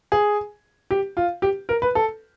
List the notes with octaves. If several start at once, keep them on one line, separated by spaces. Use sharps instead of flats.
G#4
G4
F4
G4
A#4
B4
A4